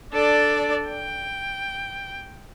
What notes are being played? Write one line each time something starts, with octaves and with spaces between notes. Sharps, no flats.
D4 A4 D5
G5